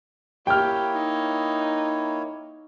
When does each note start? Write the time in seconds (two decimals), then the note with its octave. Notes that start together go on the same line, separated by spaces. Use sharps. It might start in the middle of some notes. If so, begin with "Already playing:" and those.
0.47 A#3 E4 G4 C#5 G5 F6
0.93 D#4